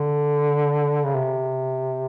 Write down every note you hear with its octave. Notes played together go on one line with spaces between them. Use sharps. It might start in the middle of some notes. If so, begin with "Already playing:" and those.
Already playing: D3
C#3
C3